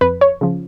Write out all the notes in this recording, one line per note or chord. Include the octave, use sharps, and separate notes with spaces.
F2 B4
C#5
C#3 F3